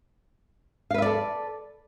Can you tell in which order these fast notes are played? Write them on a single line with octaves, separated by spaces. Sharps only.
F5 B4 E5 D5 A4